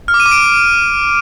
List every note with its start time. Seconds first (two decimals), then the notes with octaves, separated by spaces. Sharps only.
0.08 F6
0.14 D6
0.20 D#7
0.26 D6
0.31 D7